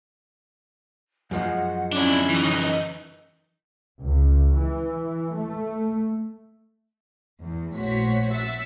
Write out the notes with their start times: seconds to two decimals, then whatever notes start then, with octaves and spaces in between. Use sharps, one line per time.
1.31 F#2 F3 G#3 F#5
1.92 C#4 D4 E4
2.30 E3 D#4
4.00 C#2
4.55 E3
5.33 A3
7.41 E2
7.77 A#1 A2 F#4 C5 C#5 B6
8.33 E5 F#5 E6 A6 B6